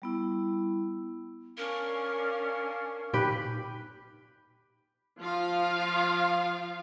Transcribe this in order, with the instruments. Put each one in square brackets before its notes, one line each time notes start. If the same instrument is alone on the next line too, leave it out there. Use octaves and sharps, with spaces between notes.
[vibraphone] G3 B3 E4
[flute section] C#4 D4 F5 [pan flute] A#4
[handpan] A#2 D#4 [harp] G4 B4
[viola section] F3 F4 F5